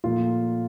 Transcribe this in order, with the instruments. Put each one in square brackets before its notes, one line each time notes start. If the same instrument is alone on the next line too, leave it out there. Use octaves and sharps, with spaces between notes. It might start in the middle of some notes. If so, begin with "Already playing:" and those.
[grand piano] A#2 F3 A3 F4